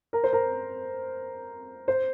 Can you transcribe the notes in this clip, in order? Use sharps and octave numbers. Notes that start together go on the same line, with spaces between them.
A#4
C5
A#4
C5